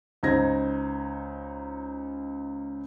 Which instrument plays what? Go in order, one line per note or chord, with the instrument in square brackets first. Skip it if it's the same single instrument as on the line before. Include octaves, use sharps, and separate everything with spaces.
[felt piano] C#2 D#4 C5 G#6 A#6